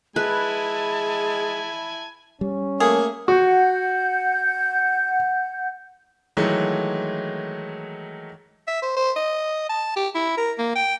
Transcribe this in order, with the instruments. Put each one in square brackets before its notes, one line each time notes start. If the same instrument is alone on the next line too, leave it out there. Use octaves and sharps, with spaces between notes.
[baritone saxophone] G#3 [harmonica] E4 G#5 [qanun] B4 [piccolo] A5
[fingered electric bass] G3 [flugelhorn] C#4
[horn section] A3 A#3 [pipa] G#4
[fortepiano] F#4 [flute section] F#5 G6
[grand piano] D#3 E3 F#3 G#3 A3
[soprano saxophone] E5
C5
C5
D#5
A5
G4
E4
A#4
A#3
G5